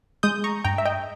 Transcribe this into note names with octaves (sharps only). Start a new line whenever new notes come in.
G#3 D#6 G6
A#5 C#6
G2 G5 A#5
E5
D#5 G5